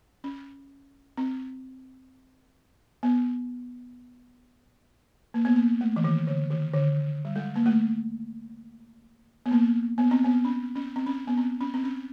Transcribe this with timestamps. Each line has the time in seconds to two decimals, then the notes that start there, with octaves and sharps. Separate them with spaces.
0.24 C#4
1.17 C4
3.03 B3
5.34 A#3
5.45 B3
5.56 A#3
5.81 A3
5.96 E3
6.04 D#3
6.27 D3
6.50 D#3
6.73 D3
7.25 G3
7.36 G#3
7.56 A#3
7.66 A3
9.46 B3
9.51 A#3
9.98 B3
10.11 C4
10.24 B3
10.45 C#4
10.75 C#4
10.96 C4
11.06 C#4
11.27 B3
11.38 C4
11.61 C#4
11.74 C4
11.84 C#4